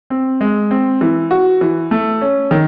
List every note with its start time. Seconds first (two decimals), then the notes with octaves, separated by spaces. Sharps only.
0.10 C4
0.41 G#3
0.71 C4
1.01 E3
1.31 F#4
1.61 E3
1.91 A3
2.21 C#4
2.51 D#3